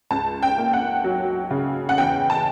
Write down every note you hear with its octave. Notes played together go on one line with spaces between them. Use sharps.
C#2 A5
G5
A#3
F#5
F#3
C#3
F#5
E2 G5
A5